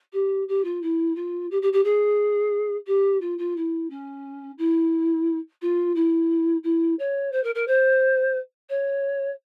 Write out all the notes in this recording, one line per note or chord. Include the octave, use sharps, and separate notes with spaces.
G4
G4
F4
E4
F4
G4
G4
G4
G#4
G4
F4
F4
E4
C#4
E4
F4
E4
E4
C#5
C5
A#4
A#4
C5
C#5